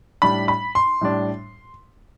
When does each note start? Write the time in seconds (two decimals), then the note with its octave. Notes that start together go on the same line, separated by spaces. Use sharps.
0.22 A2 G3 D4 B5
0.48 B5
0.75 C6
1.01 A2 G3 D4